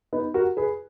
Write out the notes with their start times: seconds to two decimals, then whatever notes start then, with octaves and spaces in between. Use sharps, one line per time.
0.13 B3 D#4
0.34 F#4 A#4
0.57 G#4 B4